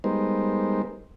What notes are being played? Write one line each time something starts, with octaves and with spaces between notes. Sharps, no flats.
G3 G#3 B3 D#4 A#4 C5